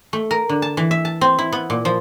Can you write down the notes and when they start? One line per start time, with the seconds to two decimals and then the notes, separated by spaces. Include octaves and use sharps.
0.13 A3
0.31 A#4
0.49 D3
0.62 A5
0.77 E3
0.91 E5
1.05 A5
1.21 C4
1.39 E4
1.53 B3
1.70 A#2
1.85 F3